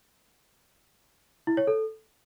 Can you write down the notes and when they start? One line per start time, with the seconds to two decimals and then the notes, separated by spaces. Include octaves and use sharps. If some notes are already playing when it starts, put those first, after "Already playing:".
1.47 E4
1.57 C#5
1.67 A4